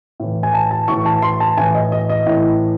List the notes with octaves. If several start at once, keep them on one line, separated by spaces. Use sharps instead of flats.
A2 E3
G#5
A5
A5
A2 E3 C#6
A5
C6
A5
A2 E3 G#5
D#5
D#5
D#5
A2 E3